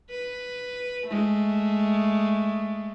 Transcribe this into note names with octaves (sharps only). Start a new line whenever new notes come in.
B4
G#3 A3